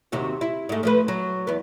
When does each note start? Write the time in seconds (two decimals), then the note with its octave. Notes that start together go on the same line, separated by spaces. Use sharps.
0.12 D#2 C3 F#4
0.41 E4
0.69 G#2 A3
0.83 F3 A3 B4
1.08 F#3
1.47 E2 B3